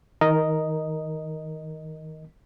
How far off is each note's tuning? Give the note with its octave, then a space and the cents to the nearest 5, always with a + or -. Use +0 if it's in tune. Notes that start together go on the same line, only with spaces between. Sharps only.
D#3 +30 A#4 +0 D#5 +0